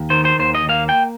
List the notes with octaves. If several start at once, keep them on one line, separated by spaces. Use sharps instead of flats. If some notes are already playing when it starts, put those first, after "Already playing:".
Already playing: D#2
D#3 C5
C5
D#2 C5
D#5
A#3 F5
G5